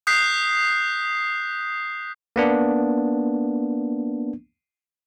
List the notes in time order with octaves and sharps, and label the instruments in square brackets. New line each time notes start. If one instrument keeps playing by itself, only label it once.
[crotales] D#6 F#6 G6 B6 C7
[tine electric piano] A#3 B3 D4